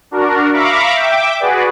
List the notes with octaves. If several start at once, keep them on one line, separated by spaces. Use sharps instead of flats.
D4 F#4 A#4
E5 F5 A#5 B5 C#6 D6
E5 G5 D6
F#4 G#4 B4 D5